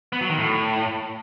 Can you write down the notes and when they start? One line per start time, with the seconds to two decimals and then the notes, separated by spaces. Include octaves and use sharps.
0.13 B3
0.21 F#3
0.30 D#3
0.39 A2